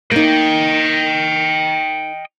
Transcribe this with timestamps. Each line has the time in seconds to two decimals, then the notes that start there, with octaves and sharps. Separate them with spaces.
0.11 A#3 D#4 D#5 G5